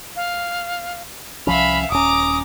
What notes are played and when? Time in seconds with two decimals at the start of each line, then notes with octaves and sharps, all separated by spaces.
0.16 F5
1.47 C2 F3 C#4 E5 F5 B5
1.90 D#1 C#4 A#5 D6 D#6